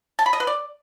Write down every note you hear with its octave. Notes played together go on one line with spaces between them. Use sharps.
A5
B5
D#5
B4
D5